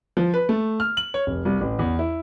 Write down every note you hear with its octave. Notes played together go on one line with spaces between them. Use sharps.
F3
B4
A3
F6
F#7
C#5
F1
C2
A1
E2
E4